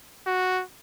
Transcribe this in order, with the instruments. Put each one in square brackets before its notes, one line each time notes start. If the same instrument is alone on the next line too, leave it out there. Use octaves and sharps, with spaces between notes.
[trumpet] F#4